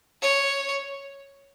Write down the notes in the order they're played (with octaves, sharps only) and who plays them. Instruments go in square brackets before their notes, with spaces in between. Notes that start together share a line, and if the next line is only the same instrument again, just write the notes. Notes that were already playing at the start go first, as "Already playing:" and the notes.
[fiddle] C#5